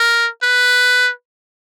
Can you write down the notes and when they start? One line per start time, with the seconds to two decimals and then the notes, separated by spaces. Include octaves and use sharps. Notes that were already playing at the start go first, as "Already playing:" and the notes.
Already playing: A#4
0.43 B4